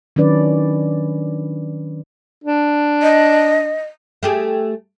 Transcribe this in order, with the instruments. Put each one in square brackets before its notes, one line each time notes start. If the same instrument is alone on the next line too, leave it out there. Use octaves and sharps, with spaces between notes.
[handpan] D#3 F#3 C#4 D4 B4 D5
[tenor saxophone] D4
[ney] D#5
[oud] A3 G4 G#4